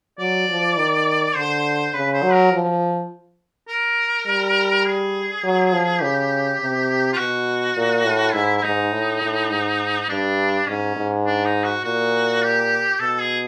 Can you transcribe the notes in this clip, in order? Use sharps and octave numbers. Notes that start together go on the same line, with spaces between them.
F#3 D5
F3
D#3
D3 C5
C#3 B4
C5
F#3
A#4
F3
A#4
G3
G#4
F#3
F3
C#3 G4
C3
F4
B2 F#4
A#2
A2
G#2 E4
E4
G#2 D#4
A2
A2
G#2
G2 D4
G#2 C#4
G#2
D4
D#4
F#4
A#2 F#4
G4
B2 A4
G#4